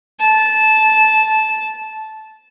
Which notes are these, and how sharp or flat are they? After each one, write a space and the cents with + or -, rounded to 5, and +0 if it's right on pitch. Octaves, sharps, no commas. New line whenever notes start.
A5 -15